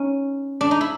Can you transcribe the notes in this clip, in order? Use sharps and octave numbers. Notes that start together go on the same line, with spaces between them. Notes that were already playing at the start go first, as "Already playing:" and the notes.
Already playing: C#4 D#4
D4
D#4
E4